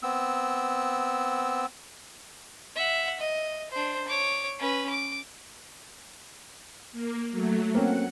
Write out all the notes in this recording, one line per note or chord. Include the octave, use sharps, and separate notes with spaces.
B3 C4 E6
E5 F#5
D#5
D4 C5
C#5 D6
C#4 B4
D6
A#3
F#3 A3
A#3 C4 C#4 F#5